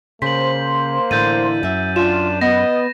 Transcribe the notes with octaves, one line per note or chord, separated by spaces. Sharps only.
C#3 A#3 C5 B6 F#7
A2 D3 E3 G6 A6 D#7
F#2 E5
D4 F4 E7
B3 D#5 A#6